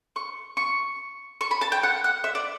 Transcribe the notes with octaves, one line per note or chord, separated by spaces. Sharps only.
C#6
C#6
C#6
B5
A5
G5
F#5
F#5
E5
D5